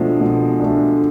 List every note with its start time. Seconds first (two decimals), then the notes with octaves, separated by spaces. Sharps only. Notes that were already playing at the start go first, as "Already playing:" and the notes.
Already playing: B2 F3 G#3 A3 D4
0.21 B2
0.60 A3 D4